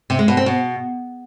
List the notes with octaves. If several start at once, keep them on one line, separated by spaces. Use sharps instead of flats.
C3
G#3
B2
C4
B2